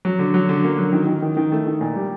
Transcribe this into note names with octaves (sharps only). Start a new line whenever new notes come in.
F#3
D3
F#3
D3
A#3
F#3
D#3
D#3
D#3
D#3
A3
D#3
A#2
G3